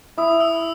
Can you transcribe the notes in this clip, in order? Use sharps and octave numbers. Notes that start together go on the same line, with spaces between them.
E4 D#6
E6